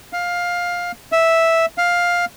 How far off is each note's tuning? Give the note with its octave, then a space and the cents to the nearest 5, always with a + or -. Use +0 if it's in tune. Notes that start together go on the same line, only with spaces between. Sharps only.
F5 +15
E5 -5
F5 +10